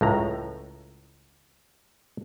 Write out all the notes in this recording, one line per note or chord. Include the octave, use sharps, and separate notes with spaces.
C#2 A2 A#5